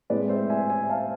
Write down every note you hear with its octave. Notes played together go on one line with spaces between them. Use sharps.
A2 G#3 C4 E4 B4 D5
C5 E5
E5 G#5
E5 G#5
F5 A5